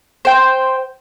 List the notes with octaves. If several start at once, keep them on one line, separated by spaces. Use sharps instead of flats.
C5 G5